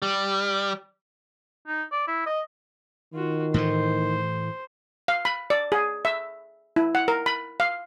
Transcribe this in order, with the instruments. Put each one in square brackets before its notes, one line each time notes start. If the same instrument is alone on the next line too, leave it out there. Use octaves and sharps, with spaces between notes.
[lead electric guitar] G3
[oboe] D#4
D5
E4
D#5
[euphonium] D#3 [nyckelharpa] F4 F#4
[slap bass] A2 E3 A3 [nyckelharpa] C5
[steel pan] F5
B5
D5
G#4
E5
E4
F#5
A#4
B5
F5